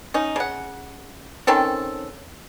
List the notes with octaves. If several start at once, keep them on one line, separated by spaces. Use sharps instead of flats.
C#4 D#4
C#3 F#5
D#3 C4 C#4 A4